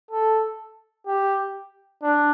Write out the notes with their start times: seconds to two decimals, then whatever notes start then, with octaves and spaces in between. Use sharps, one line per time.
0.11 A4
1.07 G4
2.03 D4